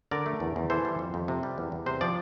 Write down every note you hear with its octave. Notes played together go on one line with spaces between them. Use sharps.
D3 A#4 D5
A3
E2
E2
E3 A4 C5
G3
F2
F2
C3
G3
E2
E2
C3 C5
F3 D5